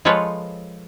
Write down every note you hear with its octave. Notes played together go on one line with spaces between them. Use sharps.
F3 G#3 F4 A4 B4 C#5